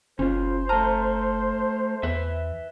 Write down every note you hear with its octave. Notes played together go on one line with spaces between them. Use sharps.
F#1 C#4 F4 C5
A3 A5 A#5 F6
E2 B4 E5